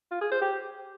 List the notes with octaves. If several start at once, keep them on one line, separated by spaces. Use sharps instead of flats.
F4
G#4
C5
G4